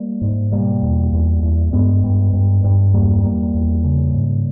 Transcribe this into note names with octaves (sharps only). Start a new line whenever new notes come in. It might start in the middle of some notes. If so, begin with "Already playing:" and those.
Already playing: G3 A#3
G#2
B2 G3 A#3
E2
E2
E2
G2 G#3 B3
G2
G2
G2
E2 G3 A#3
E2 G3 A#3
E2
C#3
G#2